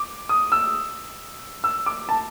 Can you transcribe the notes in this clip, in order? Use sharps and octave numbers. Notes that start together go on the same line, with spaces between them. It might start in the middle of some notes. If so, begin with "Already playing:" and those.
Already playing: D6
D#6
E6
E6
D6
A5